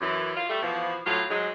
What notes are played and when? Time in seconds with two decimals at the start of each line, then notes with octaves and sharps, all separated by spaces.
0.01 F#2 E3
0.35 F4
0.49 G3 A3
0.62 B2 E3 F3
1.06 A2 F#3 F4
1.30 G#2 F#3 G#3